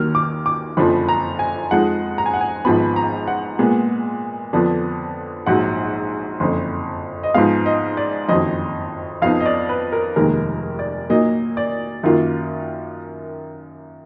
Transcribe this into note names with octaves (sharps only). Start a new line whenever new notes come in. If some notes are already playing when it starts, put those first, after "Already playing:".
Already playing: D#2 D#3 F#3 A#3 F6
D6
D6
F#1 F2 D3 F3 B5
A#5
G#5
F2 F3 G#3 D#4 F#5
A#5
G#5
F#5
G#5
G#1 G#2 F3 B3 B5
A#5
F#5
A#2 G#3 B3
F2 D3 F3 B3 D4
A#1 G#2 F#3 F#5
F#1 F2 D3
D#5
G#2 F3 G#3 B3 F5
D#5
D5
F#1 F2 D#3 F#3 D#5
F2 F3 B3 D#4 F5
D#5
D5
B4
A#4
F1 D#2 D#3 G#3 A#4
D5
A#2 F#3 A#3 D#4 D#5
D5
F#2 D#3 A#3 F4